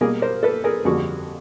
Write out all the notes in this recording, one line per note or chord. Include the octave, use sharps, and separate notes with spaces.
B2 G3 A#3 G#4 A#4
A#4 C5
A4 B4
G#4 A#4
F2 D3 G3 A#3 F#4 G#4